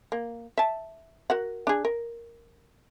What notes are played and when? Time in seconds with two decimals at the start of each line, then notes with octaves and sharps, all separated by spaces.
0.12 A#3
0.58 E5 A5
1.30 F#4 A#4 F#5
1.67 D4 G#4
1.85 A#4